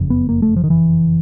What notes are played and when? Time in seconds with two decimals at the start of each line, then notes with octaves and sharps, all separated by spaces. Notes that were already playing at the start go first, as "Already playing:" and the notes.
Already playing: F#1 F2 C#3
0.10 B3
0.29 A#3
0.42 A3
0.56 F3
0.64 D#3
0.70 E3